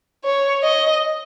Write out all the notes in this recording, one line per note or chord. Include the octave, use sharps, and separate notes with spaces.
C#5
D#5